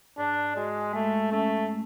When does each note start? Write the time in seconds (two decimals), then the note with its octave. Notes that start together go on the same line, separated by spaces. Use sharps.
0.18 G#2 D4
0.56 G#3 F#4
0.93 G#3 A3
1.31 A3 C#4
1.69 A3